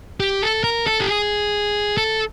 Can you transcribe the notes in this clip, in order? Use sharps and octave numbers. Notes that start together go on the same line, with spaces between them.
G4
A4
A#4
A4
G4
G#4
A4